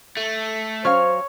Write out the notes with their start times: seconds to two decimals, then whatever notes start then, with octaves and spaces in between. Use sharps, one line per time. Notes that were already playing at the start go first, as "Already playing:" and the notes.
0.17 A3
0.85 F#3 C#4 C5 C#5 F5 C#6 F6